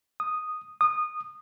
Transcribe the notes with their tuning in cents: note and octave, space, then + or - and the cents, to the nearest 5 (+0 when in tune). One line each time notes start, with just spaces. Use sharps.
D#6 -5
D#6 -20